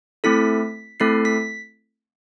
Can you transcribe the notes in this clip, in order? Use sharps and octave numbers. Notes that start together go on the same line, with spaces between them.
A3 C4 E4 A4 B6
A3 C4 E4 A4 C7
B6